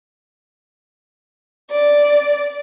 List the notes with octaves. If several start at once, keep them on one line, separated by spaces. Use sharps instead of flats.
D5